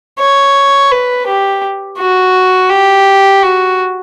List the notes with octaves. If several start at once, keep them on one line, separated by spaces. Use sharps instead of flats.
C#5
B4
G4
F#4
G4
F#4